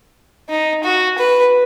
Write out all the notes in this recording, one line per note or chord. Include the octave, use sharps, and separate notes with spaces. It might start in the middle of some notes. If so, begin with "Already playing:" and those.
D#4
F#4
B4